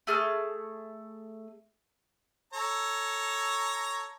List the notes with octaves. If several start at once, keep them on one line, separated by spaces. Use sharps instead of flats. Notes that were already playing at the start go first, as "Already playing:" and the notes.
A3 G#4 A5 F6
A4 C#5 A#5